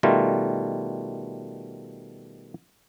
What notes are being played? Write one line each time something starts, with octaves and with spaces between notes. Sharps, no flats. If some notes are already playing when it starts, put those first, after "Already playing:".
B2 D#3 G3 A3 F4